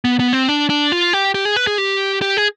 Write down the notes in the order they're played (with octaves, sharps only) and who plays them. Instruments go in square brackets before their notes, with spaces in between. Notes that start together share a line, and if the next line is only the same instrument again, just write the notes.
[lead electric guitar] B3
B3
C4
D4
D4
F4
G4
G4
G#4
B4
G#4
G4
G4
G#4